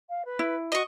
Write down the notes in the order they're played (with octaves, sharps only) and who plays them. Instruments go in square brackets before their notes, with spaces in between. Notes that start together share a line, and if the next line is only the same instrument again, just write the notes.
[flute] F5
B4
[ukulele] E4
[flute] F#4 [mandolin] D#5 C#6